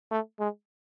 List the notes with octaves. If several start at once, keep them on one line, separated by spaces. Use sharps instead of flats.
A3
G#3